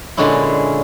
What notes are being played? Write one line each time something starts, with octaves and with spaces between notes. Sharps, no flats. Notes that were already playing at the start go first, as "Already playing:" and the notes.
A#2 D3 G#3 C#4 D4 E4